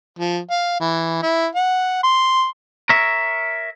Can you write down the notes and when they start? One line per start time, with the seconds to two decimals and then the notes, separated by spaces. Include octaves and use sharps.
0.19 F3
0.50 F5
0.80 E3
1.23 E4
1.55 F#5
2.04 C6
2.89 A#4 C#5 E5